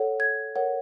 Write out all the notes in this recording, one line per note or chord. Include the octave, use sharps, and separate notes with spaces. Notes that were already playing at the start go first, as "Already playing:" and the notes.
Already playing: A4 C#5 F#5
G#6
A#4 C#5 F#5